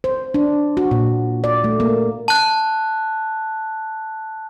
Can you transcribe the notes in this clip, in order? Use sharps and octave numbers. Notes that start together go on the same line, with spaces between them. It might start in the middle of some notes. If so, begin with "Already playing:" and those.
C5
D4
F#4
A#2
D5
A3
A#3
A5 F#6